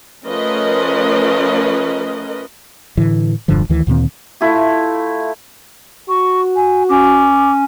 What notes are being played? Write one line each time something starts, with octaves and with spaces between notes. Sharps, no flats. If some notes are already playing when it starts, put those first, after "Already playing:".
F3 A3 C#4 A#4 B4 D#5
A2 D3 E3
E1 G2 D3 F3
D2 D#3 E3
D2 A#2 D#3 C4
A3 E4 F4 G4
F#4 C#6
G#5
C#4 D6